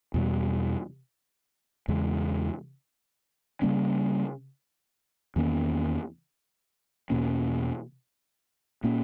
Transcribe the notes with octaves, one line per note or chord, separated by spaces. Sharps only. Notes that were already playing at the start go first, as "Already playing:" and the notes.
E2 B2 G3
E2 C#3 G#3
C#3 G3 A#3 C#4
E2 D#3 A#3 C#4
E2 B2 A#3 C#4
A#2 A#3 C#4